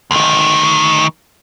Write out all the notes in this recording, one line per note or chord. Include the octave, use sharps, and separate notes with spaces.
D2 D#3